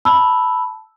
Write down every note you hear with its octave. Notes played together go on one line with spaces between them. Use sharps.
A5 B5 E6